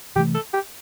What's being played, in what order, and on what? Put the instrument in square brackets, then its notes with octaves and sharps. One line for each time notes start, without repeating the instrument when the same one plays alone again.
[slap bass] C3 E3 A3 [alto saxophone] G4
[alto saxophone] A4
G4